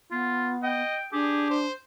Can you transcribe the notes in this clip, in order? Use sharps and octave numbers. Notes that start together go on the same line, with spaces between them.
B3 F4
D#5 G5
D4 G4 G#4
C5